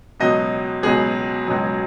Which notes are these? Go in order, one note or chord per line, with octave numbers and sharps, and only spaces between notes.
C#2 B2 F#3 D#5
C#2 B2 F#3 G#4
C#2 B2 F#3